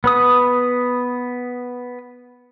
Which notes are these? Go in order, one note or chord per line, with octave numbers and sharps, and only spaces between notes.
B3 B4 D#6